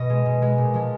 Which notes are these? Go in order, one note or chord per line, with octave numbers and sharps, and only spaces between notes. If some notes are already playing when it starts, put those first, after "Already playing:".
Already playing: B2 D#5
G#3
B2
G#3
A#2
F3 G#3